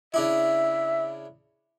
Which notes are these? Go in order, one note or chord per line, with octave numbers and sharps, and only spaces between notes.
C#3 D4 E4 E5